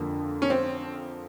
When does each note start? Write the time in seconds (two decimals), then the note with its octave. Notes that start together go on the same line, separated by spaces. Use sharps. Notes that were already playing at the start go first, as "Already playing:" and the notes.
Already playing: F2 D3 F3 A#3
0.42 C#4
0.50 C4